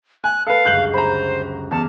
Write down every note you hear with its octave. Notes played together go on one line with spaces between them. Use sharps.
G#5 F#6
A4 B4 F5
G1 C#2 F#2 F#6 G6 F#7
C5 A#5 B5
E2 A5 D6 F6 C#7